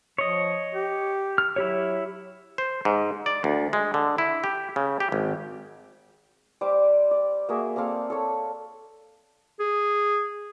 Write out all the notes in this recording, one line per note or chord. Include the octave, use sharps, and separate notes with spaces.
F3 C#5 D#5
G4
F6
F#3 E4 G4 C#5
C5
G#2
D5
D2
G#3
D3
E4
G4
C#3
G4
G#1
G3 G4 C5 D6
D5
A#3 F#4 G#4 E5
A#3 C4 A4 F5
A4 C#5
G#4